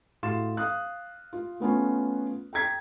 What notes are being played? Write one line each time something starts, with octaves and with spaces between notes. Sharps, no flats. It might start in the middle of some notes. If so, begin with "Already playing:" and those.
A2 F#4 F5 C6 A6 E7
F5 D#6 F#6
F4
A3 B3 C#4 F4
G5 A#5 G#6 B6